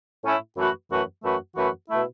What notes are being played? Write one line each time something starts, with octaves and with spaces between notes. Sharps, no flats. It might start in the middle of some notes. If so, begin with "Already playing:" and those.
A2 A3 C#4 E4
F#2 E3 A3 F#4 B4
F#2 E3 A3 F#4 B4
F#2 E3 A3 F#4 B4
F#2 E3 A3 F#4 B4
B2 A3 E4